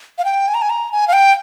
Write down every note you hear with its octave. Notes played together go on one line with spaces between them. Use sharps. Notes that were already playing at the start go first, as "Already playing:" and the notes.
F5
G5
G#5
A#5
G#5
A#5
G#5
F5
G5